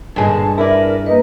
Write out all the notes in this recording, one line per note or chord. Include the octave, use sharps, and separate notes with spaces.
G2 A#2 D3 G#3 G#4 A5
E4 A#4 B4 D5
A#3 B4 D#5